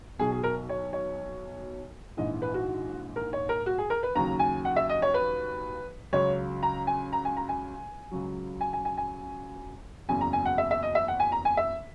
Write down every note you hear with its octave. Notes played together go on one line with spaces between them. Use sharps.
B1 B2 F#3 G#4
G#4
A#4
C#5
C#5
A#1 G#2 E3 D#5
B4
F#4
A#4
C#5
A#4
F#4
G#4
A#4
B4
D#2 C#3 F#3 A#5
G#5
F#5
E5
D#5
C#5
B4
C#2 C#3 F#3 C#5
A#5
G#5
A#5
G#5
A#5
G#5
C#2 C#3 F#3
G#5
G#5
G#5
G#5
F#1 E2 C#3 F#3 G#5
A#5
G#5
F#5
E5
E5
D#5
E5
F#5
G#5
A#5
G#5
E5